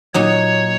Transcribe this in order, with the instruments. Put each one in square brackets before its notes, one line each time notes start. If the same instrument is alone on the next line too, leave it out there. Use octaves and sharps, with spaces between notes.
[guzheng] A#2 F#3 D#4 [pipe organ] C#5